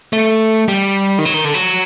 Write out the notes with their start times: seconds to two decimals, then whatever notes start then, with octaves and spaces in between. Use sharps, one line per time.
0.13 A3
0.68 G3
1.18 D#3
1.25 F#3
1.34 D#3
1.45 D3
1.54 F#3